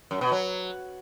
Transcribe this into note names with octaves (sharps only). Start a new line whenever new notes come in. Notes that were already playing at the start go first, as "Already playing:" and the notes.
F#2
B2
F#3